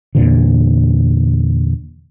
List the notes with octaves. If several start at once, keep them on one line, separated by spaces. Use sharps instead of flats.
E2 A#2 D3